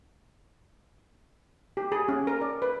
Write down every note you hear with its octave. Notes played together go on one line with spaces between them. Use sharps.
G4
G#4
C#4
A#4
D5
B4